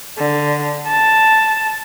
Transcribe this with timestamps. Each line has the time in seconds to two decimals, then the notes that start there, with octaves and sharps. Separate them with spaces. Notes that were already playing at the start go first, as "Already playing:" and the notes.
0.19 D3
0.88 A5